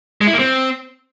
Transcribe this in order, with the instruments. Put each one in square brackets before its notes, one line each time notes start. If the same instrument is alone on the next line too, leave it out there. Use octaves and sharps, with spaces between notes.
[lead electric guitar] G#3
E4
A#3
C4